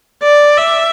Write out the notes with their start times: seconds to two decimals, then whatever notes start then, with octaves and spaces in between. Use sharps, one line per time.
0.23 D5
0.56 E5